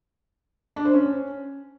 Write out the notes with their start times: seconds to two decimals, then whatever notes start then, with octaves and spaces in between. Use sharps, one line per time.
0.76 D4
0.85 C5
0.94 C#4